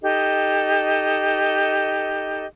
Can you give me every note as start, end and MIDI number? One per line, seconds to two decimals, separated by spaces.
0.01 2.45 63
0.01 2.45 67
0.01 2.45 69
0.01 2.45 75